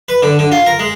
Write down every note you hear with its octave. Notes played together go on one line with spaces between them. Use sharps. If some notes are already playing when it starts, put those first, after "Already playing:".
B4
D3
D3
F4
A#4
G#3